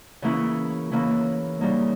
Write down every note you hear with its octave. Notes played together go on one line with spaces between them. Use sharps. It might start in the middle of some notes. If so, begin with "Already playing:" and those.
C#3 E3 A#3 C#4 E4
C#3 E3 A#3 C#4 E4
C#3 G3 A#3 D#4